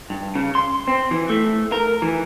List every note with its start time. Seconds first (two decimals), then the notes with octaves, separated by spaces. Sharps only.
0.10 G2
0.35 C#3
0.55 C6
0.88 C4
1.11 E3
1.30 A3
1.72 A#4
2.02 E3